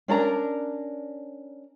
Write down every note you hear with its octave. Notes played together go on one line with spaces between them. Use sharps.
C#4 D4 A#4 A#5